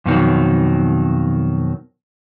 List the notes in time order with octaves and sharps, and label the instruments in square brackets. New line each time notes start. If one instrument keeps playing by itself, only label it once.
[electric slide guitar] F2 B2 D#3 F#3